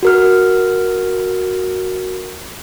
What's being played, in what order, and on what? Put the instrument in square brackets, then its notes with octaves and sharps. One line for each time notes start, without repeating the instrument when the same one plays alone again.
[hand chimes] F#4 A#4 F6